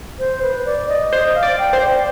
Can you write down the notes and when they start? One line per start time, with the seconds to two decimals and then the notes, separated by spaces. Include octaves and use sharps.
0.19 C5
0.42 B4
0.65 D5
0.89 D#5
1.12 C5 D#5
1.35 F5
1.43 D5
1.59 G5
1.73 C5
1.81 D5